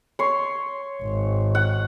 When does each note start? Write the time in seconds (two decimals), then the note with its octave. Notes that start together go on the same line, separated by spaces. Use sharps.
0.19 C#5 C6
1.04 G#1
1.55 F#5